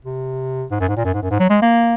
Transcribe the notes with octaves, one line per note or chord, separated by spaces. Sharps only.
C3
G#2
F#2
G#2
A#2
F#2
G#2
F#2
G#2
F#3
G#3
A#3